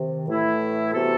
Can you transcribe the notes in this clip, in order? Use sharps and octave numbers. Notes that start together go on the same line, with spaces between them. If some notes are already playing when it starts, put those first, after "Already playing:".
Already playing: C3 D#3
A2 E3 A3 E4 A4
C3 E3 B3 F#4 A4